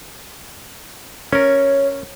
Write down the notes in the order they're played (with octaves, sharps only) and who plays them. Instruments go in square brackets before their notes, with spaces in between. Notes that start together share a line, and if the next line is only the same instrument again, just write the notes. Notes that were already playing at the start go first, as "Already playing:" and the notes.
[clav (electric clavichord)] C#4 A#4 [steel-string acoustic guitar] C#5